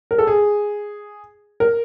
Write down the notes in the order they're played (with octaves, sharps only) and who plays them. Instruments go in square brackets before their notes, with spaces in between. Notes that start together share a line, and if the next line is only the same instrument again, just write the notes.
[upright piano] A#4
A4
G#4
A#4